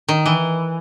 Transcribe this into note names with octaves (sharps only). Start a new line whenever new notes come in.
D#3
E3